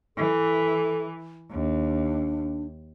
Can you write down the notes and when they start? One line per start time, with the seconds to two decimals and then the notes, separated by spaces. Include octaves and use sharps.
0.17 E3 A4
1.51 D#2 D4